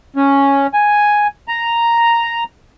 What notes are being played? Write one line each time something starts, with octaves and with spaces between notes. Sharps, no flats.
C#4
G#5
A#5